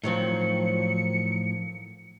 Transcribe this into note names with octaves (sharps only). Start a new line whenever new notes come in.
A2 D#3 F3 F#3 C4 C#7